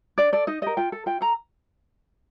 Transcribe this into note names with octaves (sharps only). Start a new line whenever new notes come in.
D4 D5
A4 D5
D#4 D#5
G4 A#4 D#5
F4 G5
A4
F4 G5
A4 A#5